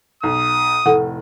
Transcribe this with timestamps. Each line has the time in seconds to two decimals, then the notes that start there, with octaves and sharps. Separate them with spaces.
0.23 B1 D#6
0.86 F1 A2 E4 A4 F#5